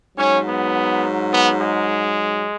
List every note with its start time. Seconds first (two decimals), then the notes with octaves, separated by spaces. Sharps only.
0.16 G#2 F#3 C#4
0.45 B3
1.31 B3
1.61 G#3